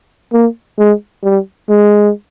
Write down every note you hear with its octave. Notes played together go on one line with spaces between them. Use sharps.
A#3
G#3
G3
G#3